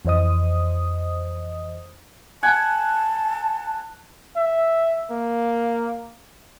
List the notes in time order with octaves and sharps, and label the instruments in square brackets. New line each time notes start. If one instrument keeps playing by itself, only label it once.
[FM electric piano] F2 E3 C5 D#5 D#6
[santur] F#5 G#5 [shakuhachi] A5
[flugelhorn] E5
A#3